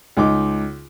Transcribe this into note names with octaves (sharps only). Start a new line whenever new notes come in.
C#2 D#4 D6